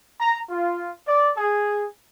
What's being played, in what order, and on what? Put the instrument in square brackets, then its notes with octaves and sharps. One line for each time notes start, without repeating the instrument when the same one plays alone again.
[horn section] A#5
F4
D5
G#4